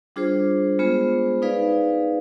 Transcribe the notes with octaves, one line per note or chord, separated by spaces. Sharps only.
G3 D4 F4 G#4 C5
G#3 B3 F4 G#4 C5
D#4 G#4 B4 D5 F5